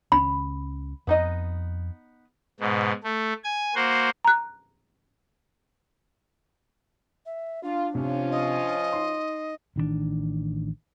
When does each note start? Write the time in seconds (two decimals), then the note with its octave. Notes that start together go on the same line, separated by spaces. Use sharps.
0.12 C#2 C#4 B5
1.07 F2 B3 D#4 D#5
2.60 G#2 B2
3.04 A3
3.44 G#5 G#6
3.75 A#3 F#4 C5
4.25 A#5 F#6
7.26 E5
7.64 D4 F4
7.95 C3 F3 C#4 F4
8.31 D#5
8.93 D#4 C6
9.76 A1 D#3 A3 D4